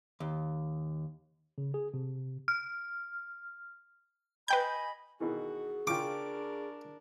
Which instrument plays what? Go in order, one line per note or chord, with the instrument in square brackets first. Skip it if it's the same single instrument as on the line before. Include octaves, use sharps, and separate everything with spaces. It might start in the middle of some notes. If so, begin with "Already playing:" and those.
[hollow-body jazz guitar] D#2
[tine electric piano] C#3
G#4
C3
[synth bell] F6
[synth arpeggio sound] B4 G5 G6 [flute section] D#5 G#5 B5
[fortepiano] B2 D#3 E3 [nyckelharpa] F#4 [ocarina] G#4
[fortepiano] C#3 F4 G5 [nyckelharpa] D4 A#4 [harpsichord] D6